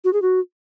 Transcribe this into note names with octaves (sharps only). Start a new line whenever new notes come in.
F#4
G#4
F#4